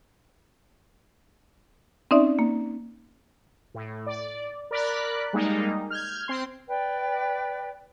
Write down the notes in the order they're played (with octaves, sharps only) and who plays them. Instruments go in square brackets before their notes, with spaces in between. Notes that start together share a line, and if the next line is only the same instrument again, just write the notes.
[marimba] C4 C#4 D#4 D5 E5
A#3
[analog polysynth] A2
D5
A#4 D5 B5 F#6
G3 G#3 A#3 D#4
F6 G6 G#6
C4 C6
[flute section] B4 D5 G5